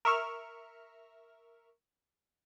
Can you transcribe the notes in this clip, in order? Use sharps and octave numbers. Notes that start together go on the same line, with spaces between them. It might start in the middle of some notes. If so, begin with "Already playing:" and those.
A#4 E5 C#6 F6